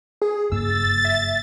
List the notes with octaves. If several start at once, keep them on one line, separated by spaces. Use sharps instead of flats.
G#4
F#1 G2 A#3 E6 A6
E5